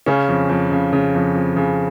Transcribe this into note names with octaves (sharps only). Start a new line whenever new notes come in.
C#3 C#4
F2
F2
C#3
C#3
F2
F2
C#3